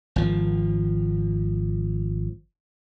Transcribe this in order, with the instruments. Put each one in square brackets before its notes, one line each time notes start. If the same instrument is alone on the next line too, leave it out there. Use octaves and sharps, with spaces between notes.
[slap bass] G#1 F3